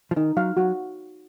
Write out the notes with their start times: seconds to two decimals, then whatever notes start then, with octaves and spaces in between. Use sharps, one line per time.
0.11 F3
0.16 D#3 D#4
0.37 F#3 F5
0.57 F#3 F#4